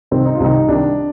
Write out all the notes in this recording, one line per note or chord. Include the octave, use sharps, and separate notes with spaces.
C2 C3 D#3 C4
D#4
F4
C2 C3 D#3 D#4
C2 C3 D#3 D4